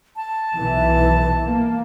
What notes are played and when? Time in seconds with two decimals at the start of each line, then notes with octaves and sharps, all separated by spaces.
0.16 A5
0.54 B1 E3
1.46 A#3